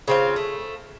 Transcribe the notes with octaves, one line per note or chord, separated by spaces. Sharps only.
C#3 C4 F4
A3